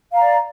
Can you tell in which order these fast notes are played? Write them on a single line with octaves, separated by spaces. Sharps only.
F5 A#5 D5